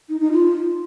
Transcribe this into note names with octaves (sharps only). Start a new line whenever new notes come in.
D#4
D#4
F4